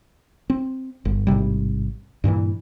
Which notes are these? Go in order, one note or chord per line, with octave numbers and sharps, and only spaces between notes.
C4
G1
A1 G#2 C3 G3
G2 A#2 D#3 E3